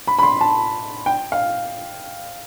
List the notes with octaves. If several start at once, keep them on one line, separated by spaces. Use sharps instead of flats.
B5
B5
C6
A5
G5
F5